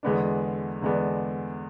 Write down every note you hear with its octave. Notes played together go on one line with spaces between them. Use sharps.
E2 D3 G#3 B3 D4
E2 D3 G#3 B3 D4